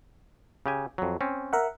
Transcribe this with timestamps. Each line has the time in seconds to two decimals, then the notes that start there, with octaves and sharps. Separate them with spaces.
0.66 C#3 G4 G#5
0.98 F2 F#3
1.21 C4 C#4
1.53 A#4 E5 F#5